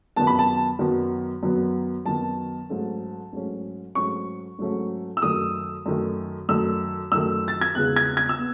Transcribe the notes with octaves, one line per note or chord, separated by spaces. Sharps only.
F#2 D#3 F#3 B3 A5
B5
A5
F#2 D#3 F#3 B3
F#2 D#3 F#3 B3
F#2 D#3 F#3 B3 A5
G#2 F#3 A3 C#4
G#2 F#3 A3 C#4
G#2 F#3 A3 C#4 C#6
G#2 F#3 A3 C#4
E6
F#2 D#3 A3 D#6
F#2 D#3 A3
F#2 D#3 A3 E6
F#2 D#3 A3 E6
A6
G#6
E2 C#3 G#3 B3 F#6
G#6
G#6
E6
B3